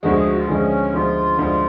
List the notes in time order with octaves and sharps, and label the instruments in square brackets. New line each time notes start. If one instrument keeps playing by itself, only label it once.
[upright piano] D2 D3 F3 G#3 [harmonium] F#4
[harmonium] G#4
F#4
F4
[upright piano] D2 D3 F3 G#3 [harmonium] C#4
[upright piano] D2 D3 F3 G#3 [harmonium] F4
[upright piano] D2 D3 F3 G#3